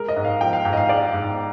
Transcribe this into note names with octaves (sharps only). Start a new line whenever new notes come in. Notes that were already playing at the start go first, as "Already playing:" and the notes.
Already playing: G#3 A#4
D#5
G#2
F5
F3 G5
F5
G#2 G5
D#5
F5
G#3 D5
G#2